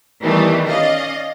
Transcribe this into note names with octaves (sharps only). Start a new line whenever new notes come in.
D#3 E3 G3 A3 B3
C#4 D5 D#5 F5